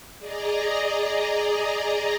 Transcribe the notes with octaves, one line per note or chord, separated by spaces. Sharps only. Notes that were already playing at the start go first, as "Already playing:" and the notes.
G#4 D5 D#5 A#5